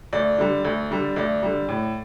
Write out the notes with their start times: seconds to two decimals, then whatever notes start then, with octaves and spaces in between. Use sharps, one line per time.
0.13 D2 D5
0.38 D3 G3
0.65 D2
0.91 D3 G3
1.16 D2 D5
1.43 D3 G3
1.69 A2